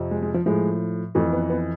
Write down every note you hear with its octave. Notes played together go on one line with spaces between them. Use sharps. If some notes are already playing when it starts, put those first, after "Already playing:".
Already playing: F2 C3 F3
G#3
G#3
F3
A2 F3 G#3
F2 E3 A3
B3
B3